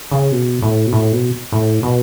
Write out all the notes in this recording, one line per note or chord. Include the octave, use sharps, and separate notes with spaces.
C#3
B2
A2
B2
A2
B2
A2
B2